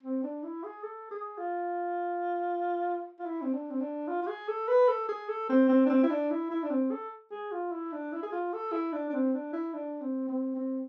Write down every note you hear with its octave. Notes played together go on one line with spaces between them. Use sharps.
C4
D4
E4
G#4
A4
G#4
F4
F4
E4
C4
D4
C4
D4
F4
F4
G#4
A4
B4
A4
G#4
A4
C4
C4
D4
C4
E4
D4
E4
E4
D4
C4
A4
G#4
F4
E4
D4
E4
G#4
F4
A4
E4
D4
D4
C4
D4
E4
D4
C4
C4
C4